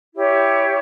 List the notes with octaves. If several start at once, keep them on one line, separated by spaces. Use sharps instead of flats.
E4 G4 C#5 E5